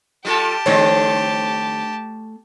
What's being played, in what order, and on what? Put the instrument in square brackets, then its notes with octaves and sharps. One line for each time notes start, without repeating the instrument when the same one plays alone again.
[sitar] G3 F4 A4 [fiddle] G4 A5
[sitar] D3 G3 C4 [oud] A3 C#5